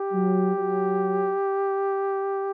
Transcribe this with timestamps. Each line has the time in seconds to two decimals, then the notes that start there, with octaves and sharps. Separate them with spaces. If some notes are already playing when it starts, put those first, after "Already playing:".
Already playing: G4
0.13 F#3
0.56 F#3